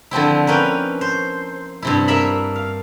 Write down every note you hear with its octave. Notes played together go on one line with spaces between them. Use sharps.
D3 F3 C4 E4
A#3 C#4 B4 G5
C5
G2 C3 E4
A#3 E5 B5
F5